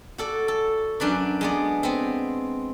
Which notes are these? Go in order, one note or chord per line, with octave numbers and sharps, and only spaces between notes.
F#4 A4 D5
A4
F#2 D4 B4 D5
G#3 B3 D5
B3 C4